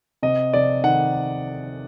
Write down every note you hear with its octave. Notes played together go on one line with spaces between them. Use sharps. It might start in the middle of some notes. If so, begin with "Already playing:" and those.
C3 D#5
C3 D5
D#3 F#5